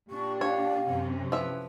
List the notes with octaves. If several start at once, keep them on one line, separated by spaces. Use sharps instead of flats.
A#2 D4 G4 C#6
C#5 F5
F#2 C3 C#4
A2 F3 B4 E5